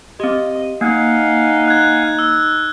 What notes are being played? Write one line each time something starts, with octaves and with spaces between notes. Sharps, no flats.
C4 G4 D#5
A#3 D#4 F5 F#5 G#5
F#6 G#6
E6